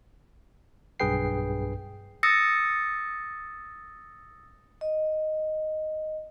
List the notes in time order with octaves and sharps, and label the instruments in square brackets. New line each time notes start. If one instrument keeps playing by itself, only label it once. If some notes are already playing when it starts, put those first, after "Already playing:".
[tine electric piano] B1 G2 G#4 B4 G5 C7
[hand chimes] D#6 E6 A6 A#6 C#7
[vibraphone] D#5